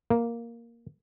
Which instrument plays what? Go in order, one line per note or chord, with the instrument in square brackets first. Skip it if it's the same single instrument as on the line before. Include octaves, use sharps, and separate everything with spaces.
[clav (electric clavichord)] A#3